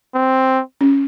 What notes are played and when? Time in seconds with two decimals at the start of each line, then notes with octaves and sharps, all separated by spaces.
0.15 C4
0.81 C#4